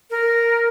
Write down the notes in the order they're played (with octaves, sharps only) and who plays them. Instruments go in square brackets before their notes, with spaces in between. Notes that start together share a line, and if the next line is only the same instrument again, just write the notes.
[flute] A#4